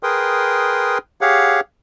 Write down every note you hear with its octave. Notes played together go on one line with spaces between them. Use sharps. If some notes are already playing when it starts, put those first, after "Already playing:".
G#4 A#4 B4 G5 C6 D#6
G4 G#4 C#5 F5 F#5